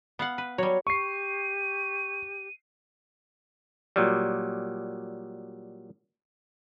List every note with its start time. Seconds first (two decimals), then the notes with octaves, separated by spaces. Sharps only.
0.19 B3 F5 F#5
0.38 B4
0.58 F#3 G3 C#5
0.87 G4 C#6 C7 D#7
3.96 A#2 F#3 G3